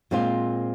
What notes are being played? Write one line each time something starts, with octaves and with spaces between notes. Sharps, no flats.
A#2 G#3 C4 F4